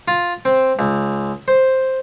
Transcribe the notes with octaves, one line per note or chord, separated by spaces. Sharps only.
F4
C4
C#2
C5